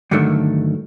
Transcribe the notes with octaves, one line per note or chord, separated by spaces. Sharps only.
G2 D3 D#3 F#3 A3